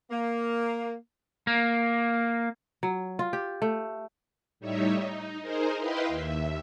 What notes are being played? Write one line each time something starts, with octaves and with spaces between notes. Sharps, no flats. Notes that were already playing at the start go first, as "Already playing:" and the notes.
A#3
A#3
F#3
F4
G4
A3
A2 G3 D#4 C#5 E5
D#4
D#4 G#4 A#4 C5
E4 B4 D#5 F5 G5 C6
D#2 E5